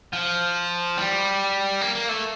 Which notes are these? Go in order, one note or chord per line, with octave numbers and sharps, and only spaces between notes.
F3
G3
A#3
A#3
A3